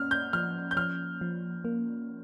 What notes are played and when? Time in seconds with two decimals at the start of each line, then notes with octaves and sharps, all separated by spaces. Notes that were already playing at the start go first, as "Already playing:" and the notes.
Already playing: A#3 C#4 F6
0.11 G6
0.33 F3 F6
0.71 G6
0.76 F3 F6
1.21 F3
1.65 A#3